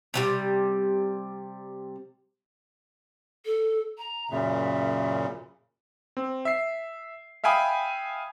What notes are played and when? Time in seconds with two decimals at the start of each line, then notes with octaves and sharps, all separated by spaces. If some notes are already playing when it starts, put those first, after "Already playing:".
0.14 C3 F#3 G3
3.45 A4
3.98 A#5
4.31 F#2 A#2 C#3 E5
6.17 C4
6.45 E5 C7
7.44 E5 F5 G5 G#5 B5 D#6